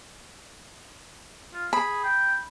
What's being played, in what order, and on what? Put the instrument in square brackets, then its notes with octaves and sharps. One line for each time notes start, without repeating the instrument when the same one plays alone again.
[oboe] F4
[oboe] G#4 [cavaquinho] B5
[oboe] G5